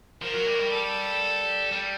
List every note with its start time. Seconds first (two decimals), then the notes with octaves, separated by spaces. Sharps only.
0.22 F3 A#4
0.35 F#3
0.47 G3
0.54 F#3
0.59 G3
0.72 A4
1.72 G3